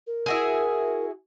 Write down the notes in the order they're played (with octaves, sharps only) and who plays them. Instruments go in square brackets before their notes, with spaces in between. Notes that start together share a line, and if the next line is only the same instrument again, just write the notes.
[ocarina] A#4
[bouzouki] E4 F#4 G#4